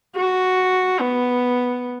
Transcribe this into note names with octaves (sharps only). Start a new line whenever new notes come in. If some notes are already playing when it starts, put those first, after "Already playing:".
F#4
B3